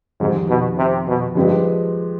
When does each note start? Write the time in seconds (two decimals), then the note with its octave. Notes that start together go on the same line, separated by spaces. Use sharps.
0.20 F2 G#2 D#3 G3
0.49 B2
0.78 C3
1.07 B2
1.35 G2 F3 G#3 C4 G4 B4